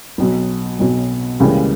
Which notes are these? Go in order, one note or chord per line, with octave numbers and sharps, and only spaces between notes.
B1 B2 F#3
B1 B2 F#3
C#2 C#3 E3 G3 A#3